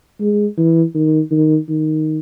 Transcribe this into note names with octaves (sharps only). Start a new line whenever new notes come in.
G#3
E3
D#3
D#3
D#3